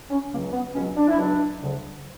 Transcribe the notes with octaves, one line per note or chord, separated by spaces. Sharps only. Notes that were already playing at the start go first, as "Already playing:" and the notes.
C#4
C#2 C#3 F#3 A#3
B3
C#2 B2 F#3 C#4
D4
E4
C#2 B2 F#3 D4
D2 C#3 F#3